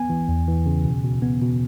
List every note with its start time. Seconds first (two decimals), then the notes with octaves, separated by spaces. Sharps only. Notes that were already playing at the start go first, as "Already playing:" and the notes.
Already playing: B3 G#5
0.10 E3
0.28 E2
0.48 E3
0.66 C#3
0.85 B2
1.04 B2
1.22 B3
1.41 B2